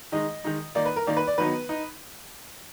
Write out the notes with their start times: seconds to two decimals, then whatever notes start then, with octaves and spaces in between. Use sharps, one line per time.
0.12 D#3 G#3 D#4 D#5
0.44 D#3 G#3 D#4
0.75 D#3 A#3 D#4 D5
0.86 B4
0.96 A#4
1.07 D#3 A#3 D#4 D5
1.17 B4
1.27 D5
1.38 D#3 F#3 B3 D#4 B4
1.69 D#4